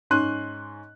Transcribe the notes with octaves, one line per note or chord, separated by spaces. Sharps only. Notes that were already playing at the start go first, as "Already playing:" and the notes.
G#2 C#4 C6 F#6 D#7